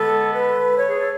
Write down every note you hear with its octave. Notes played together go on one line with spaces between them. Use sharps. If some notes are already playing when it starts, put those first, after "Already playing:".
Already playing: D3 G#3 B3 A4
B4
C#5
G#4
A4